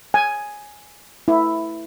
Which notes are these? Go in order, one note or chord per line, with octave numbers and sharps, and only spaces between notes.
G#5
E4